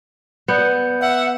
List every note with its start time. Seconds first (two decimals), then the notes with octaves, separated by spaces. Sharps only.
0.48 B3 D5 G6 C#7
1.01 E5 F#5